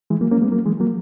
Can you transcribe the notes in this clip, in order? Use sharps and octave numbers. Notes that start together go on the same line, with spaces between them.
E3 G#3
F#3 A#3
A#3 C#4
G#3 B3
F#3 A#3
E3 G#3
F#3 A#3